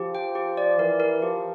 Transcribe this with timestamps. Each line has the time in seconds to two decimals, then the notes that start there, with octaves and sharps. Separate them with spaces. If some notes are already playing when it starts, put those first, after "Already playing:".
Already playing: F3 G4
0.15 G5
0.35 G4
0.57 D5
0.79 E3 A#4
1.00 A#4
1.21 F3 G4